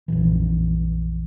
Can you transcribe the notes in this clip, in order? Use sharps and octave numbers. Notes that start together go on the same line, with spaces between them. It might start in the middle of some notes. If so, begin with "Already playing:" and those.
A#1 F2 A#2 E3